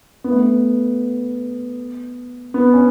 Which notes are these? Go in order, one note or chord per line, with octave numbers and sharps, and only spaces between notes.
B3
A3
B3
B3
C#4